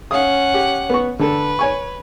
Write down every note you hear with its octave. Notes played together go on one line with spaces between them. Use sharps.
C#4 F5 F#5 D#6
G4
B3 C#6
D3 A4 B4
C#5 G#5 C#6